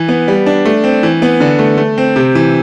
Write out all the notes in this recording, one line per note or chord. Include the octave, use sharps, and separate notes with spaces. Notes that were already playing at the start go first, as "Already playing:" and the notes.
Already playing: E3
B3
G3
D4
A3
C4
E3
B3
D3
A3
A3
C4
C3
E3